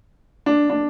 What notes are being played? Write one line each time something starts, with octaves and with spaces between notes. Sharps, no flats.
D4
D4